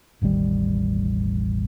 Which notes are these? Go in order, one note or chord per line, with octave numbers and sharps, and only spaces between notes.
E1 A1 D#3 G3